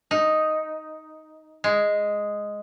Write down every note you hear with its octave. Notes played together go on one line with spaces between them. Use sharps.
D#4
G#3